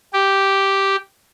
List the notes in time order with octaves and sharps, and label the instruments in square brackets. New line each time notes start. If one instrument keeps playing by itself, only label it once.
[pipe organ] G4